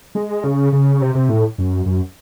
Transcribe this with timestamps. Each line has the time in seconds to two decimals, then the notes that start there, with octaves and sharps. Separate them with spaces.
0.15 G#3
0.44 C#3
0.73 C#3
1.01 C3
1.15 C3
1.29 A2
1.58 F#2
1.86 F#2